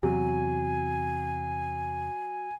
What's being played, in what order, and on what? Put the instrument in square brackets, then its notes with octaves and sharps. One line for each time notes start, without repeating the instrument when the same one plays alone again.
[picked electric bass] E2 C3 [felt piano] F#3 [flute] G#5